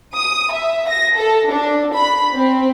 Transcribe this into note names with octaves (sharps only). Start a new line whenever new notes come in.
D#6
E5
A#6
A4
D4
B5
C4